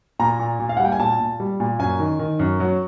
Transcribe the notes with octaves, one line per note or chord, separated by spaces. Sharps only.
A#2 A#5
A#2
A#2
F5
F#5
G3
G5
G#5
A#2 A5
A#2
G3
A#2
F#2 G#5
D#3
D#3
F#2
F#3